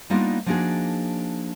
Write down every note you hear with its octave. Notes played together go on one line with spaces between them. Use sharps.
G3 A#3 B3 D4 D#4 F4
F3 A#3 D4 D#4 F#4 G#4